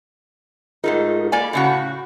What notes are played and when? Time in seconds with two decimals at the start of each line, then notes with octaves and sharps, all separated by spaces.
0.84 G#2 A3 D#4 F4 G#4 A#4
1.32 A#3 D5 G#5 B5
1.53 A2 C#3 F#4